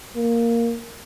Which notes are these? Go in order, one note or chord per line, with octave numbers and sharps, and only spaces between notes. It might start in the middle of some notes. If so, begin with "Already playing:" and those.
A#3